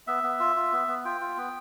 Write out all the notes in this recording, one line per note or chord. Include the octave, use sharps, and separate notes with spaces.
B3 E5
B3
F4
F4
B3
B3
F4 G5
F4
B3